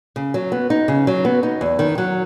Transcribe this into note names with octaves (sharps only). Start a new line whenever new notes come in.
C#3
F#3
B3
D#4
C#3
F#3
B3
D#4
E2
D#3
F#3